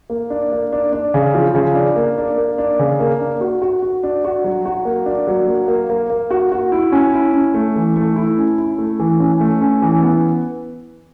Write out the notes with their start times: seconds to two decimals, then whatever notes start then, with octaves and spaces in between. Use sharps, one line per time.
0.10 A#3
0.30 D4
0.52 A#3
0.72 D4
0.93 D4
1.14 C#3
1.35 F3
1.55 C#3
1.75 D4
1.96 A#3
2.18 D4
2.38 A#3
2.58 D4
2.79 C#3
3.00 A#3
3.20 D4
3.41 F#4
3.62 F#4
3.83 F#4
4.03 D4
4.24 F#4
4.44 F#3
4.65 F#4
4.85 A#3
5.06 D4
5.27 F#3
5.47 A#3
5.68 A#3
5.90 A#3
6.10 A#3
6.31 F#4
6.52 F#4
6.72 E4
6.92 C#4
7.14 E4
7.33 C#4
7.54 A3
7.76 E3
7.96 A3
8.16 E4
8.38 C#4
8.58 E4
8.78 A3
9.00 E3
9.19 C#4
9.41 A3
9.61 C#4
9.82 E3
10.02 B3